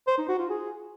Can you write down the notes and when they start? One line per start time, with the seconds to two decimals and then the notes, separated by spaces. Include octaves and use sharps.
0.07 C5
0.18 D#4
0.28 F#4
0.39 F4
0.50 G#4